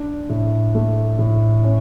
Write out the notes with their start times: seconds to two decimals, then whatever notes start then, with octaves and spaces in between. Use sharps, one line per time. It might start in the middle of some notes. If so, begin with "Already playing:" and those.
Already playing: D4
0.29 A2
0.75 A3
1.19 A2
1.64 C#4